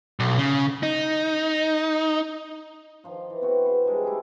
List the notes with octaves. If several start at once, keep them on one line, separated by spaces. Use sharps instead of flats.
B1
C#3
D#4
D#3 F3 F4
E3
B3 C4 F#4
B4 C5 E5
D3 G3 G#3 A#4
A3 E4 G4 G#4